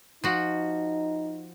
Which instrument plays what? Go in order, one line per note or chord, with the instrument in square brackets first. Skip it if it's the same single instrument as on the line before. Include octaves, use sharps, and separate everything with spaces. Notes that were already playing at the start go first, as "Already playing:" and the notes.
[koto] F3 F#4 [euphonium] D#4